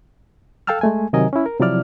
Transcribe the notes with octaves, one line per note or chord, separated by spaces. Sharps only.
A4 F5 G5 A5 E6 F6
G#3 A3 G#5
C3 D#3 F#3 A#4 D#5 G#5
C#4 E4
A#4
C3 F3 F#3 E4 D5 F6